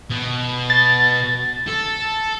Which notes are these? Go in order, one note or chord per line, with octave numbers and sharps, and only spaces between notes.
B2
A6
A4